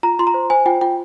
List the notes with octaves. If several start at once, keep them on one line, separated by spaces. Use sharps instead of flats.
F4 A#5
F4 C6
A#5
C5
C5 G#5
F4 G5
F4 G5